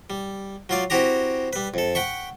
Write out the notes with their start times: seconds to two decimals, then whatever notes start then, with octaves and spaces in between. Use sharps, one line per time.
0.10 G3
0.69 F#3 F4 D5
0.90 C4 E4 F#4 G4 A#5
1.53 G3 B4
1.74 F2 A4
1.95 F#5 G5 B5 C#6